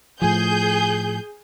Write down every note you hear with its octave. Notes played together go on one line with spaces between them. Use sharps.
A2 F3 G#4 G6